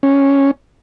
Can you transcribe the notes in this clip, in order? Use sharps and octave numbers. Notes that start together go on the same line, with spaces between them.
C#4